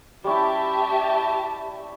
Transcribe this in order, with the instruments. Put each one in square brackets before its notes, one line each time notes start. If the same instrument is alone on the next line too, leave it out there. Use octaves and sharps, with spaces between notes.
[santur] G3 C#4 E4 [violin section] G4 E5 A5